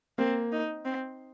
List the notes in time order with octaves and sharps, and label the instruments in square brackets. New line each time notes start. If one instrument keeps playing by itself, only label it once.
[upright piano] A#3 [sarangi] C4
[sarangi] D#4
C4